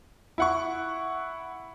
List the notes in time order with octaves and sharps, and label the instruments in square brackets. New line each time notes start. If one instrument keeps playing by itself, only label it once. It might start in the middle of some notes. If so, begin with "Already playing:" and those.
[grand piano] E4 F#5 C#6